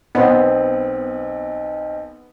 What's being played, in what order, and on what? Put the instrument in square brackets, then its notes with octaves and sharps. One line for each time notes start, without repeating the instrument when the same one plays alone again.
[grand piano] B1 C4 C6 [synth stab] B3